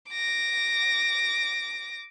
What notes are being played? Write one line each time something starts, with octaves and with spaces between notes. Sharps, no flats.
D6 A#6